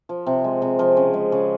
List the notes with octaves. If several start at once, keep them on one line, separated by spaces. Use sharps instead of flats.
F3
C3
G#3
C3
F3
C#3
G#3
C#3